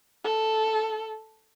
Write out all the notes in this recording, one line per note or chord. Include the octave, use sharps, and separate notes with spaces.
A4